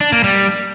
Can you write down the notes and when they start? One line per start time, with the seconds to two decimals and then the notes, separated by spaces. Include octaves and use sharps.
0.01 D4
0.12 A#3
0.24 G3